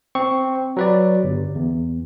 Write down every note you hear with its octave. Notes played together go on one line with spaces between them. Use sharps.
C4 C#6
F#3 B4 D5
G1
E2